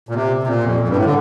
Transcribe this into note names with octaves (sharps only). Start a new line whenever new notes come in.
A#2
C3
C3
A#2
F2
F2
G2
A2
D3